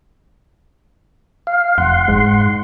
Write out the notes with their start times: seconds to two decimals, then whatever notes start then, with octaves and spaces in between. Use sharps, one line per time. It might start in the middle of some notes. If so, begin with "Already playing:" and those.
1.47 F5
1.78 F1 F#5 C6
2.08 G#2